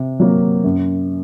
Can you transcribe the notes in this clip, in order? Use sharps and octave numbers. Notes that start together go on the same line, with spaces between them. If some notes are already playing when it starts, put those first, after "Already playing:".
Already playing: C3
F#3 A#3
F#2